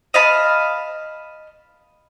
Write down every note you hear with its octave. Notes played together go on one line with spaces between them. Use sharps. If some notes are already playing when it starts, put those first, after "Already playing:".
D#5 F5 A5 B5